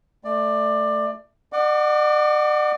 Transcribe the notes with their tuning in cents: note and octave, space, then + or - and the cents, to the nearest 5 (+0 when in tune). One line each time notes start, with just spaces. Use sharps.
A3 +0 D5 +20
D5 +45 F#5 +0 D6 -5